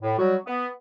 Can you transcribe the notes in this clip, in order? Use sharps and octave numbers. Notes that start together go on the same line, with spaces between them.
A2
F#3 G3 F#4
B3